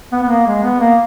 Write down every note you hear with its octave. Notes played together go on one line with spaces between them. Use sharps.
B3
B3
A#3
G#3
B3
A#3